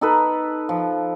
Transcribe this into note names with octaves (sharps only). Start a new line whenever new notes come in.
D#4 A4 B4
F3